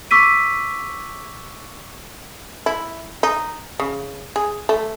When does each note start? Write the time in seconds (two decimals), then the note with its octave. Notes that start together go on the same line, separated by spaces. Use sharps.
0.11 C#6 D6 E6 B6 D#7
2.66 E4
3.23 D#4
3.80 C#3
4.36 G#4
4.69 A3